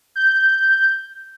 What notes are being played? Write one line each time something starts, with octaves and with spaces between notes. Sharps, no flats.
G6